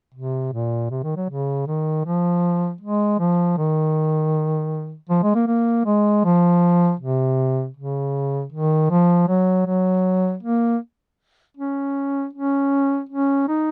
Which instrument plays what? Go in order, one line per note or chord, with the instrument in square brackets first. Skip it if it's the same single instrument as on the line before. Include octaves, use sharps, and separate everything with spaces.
[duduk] C3
A#2
C3
D#3
F#3
C#3
D#3
F3
G#3
F3
D#3
F3
G#3
A#3
A#3
G#3
F3
C3
C#3
D#3
F3
F#3
F#3
A#3
C#4
C#4
C#4
D#4